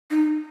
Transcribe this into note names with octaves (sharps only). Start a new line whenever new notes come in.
D#4